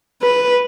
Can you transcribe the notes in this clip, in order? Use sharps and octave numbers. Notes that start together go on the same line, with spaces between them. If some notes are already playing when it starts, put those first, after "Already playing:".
B4